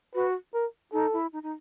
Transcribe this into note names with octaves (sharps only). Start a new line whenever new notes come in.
F#4 B4
A#4
D#4 A4
E4
D#4
D#4